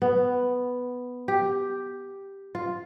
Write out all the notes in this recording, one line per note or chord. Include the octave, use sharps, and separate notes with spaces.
B3
G4
F4